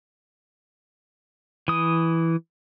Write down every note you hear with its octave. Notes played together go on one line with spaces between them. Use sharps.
E3 D#6